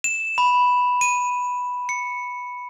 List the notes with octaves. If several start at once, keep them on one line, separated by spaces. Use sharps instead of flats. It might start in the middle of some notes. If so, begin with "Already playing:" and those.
E7
B5
D#7
C#7